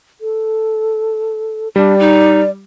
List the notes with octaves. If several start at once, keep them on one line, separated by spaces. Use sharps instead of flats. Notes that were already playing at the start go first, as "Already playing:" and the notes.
A4
G3 D4 D5
D#4